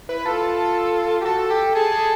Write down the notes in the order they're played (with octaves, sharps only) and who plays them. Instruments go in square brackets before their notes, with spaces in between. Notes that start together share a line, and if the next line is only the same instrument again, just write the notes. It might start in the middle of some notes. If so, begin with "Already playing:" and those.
[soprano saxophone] E4 [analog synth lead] B4
[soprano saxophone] F4 [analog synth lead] A4
[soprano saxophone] G4
[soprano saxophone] F#4 [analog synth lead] A4
[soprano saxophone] G4
[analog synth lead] G#4 [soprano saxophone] A4
[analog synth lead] G#4